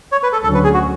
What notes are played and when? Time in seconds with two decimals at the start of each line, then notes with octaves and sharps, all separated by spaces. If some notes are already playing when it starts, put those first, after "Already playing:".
0.12 C#5
0.23 B4
0.33 A4
0.43 D2 D3 F#3 C#4 A4
0.54 B4
0.64 G#4
0.74 F#4